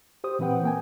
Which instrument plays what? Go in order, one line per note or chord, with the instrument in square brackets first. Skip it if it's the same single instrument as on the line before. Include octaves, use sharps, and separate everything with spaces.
[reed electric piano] G4 C5 D#6
A#2 E3 C4 B4 F#5 G5
A#3 G5 G#5